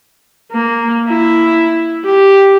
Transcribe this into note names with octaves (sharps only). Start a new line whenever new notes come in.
A#3
E4
G4